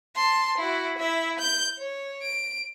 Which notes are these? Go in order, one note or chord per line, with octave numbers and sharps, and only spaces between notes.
A5 C6
E4 F#4
E4 E5
G6
C#5
D7